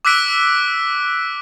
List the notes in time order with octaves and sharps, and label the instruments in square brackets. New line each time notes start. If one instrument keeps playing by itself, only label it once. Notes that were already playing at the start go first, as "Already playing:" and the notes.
[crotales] D6 E6 F#6 B6 D7